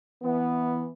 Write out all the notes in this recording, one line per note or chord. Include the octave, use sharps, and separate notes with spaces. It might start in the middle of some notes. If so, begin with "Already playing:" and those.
E3 B3